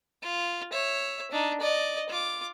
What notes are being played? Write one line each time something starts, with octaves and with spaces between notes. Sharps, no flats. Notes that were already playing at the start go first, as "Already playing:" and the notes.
F4
C#5 E5
D4 D#4
D5 D#5
F4 D6